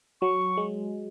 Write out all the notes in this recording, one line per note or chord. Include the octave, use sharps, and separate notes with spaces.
F#3 C#6
G#3